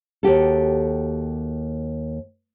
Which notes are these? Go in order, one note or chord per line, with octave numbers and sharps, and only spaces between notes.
D#2 F#4 G4 A4